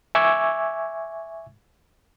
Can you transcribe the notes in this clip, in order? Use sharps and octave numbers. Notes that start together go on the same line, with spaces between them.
E5 G#5 C#6 D6 E6 G#6